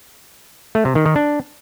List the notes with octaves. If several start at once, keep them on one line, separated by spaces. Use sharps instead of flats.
A3
C3
D#3
D#3
D4